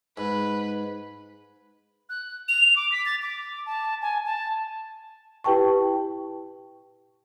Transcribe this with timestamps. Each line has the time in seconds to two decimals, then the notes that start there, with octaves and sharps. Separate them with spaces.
0.17 G#2 B4
2.09 F#6
2.48 F7
2.76 D6
2.92 B6
3.05 A6
3.22 D6
3.66 A5
4.02 G#5
4.25 A5
5.44 E4 G4 B4 G5 A5 C#6